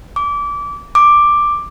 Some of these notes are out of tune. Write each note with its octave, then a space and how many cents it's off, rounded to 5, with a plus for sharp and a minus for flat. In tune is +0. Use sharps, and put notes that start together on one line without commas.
D6 -25
D6 +5